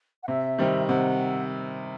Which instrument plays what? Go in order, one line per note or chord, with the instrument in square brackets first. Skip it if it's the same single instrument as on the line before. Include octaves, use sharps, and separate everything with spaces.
[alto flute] F#5
[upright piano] C3 [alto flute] E5
[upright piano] D#3 G3 C4 D#4
[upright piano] C3 [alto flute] F#5